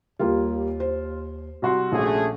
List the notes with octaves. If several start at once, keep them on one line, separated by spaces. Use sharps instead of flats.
D#2 G3 A#3 F4
C5
C2 F#4 C6
A#1 A3 C#4 G#4